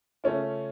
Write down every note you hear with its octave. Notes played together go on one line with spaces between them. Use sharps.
C#3 A3 C#4 F4